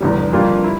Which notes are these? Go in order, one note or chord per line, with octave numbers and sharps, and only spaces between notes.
F1 E2 D3 G3
F2 D3 G3 A#3 F4
E4